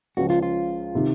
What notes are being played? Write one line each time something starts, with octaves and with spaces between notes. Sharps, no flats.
C#2 C#3 F3 F#4
F4
F4
C3 D#3